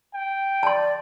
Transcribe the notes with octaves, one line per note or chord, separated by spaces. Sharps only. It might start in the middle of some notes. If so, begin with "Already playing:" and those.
G5
D5 A5 C6